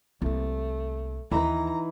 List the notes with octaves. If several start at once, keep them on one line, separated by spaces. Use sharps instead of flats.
C2 A3 A#3
D#2 E3 D#4 B4 A#5